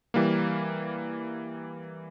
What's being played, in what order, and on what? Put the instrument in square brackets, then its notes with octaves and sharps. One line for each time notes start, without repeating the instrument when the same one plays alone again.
[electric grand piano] E3 G3 A#3